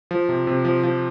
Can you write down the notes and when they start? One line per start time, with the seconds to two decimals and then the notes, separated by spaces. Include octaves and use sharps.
0.11 F3
0.29 C3
0.47 C3
0.65 F3
0.83 F3